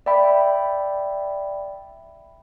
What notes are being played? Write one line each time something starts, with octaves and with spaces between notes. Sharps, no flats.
D5 E5 G5 B5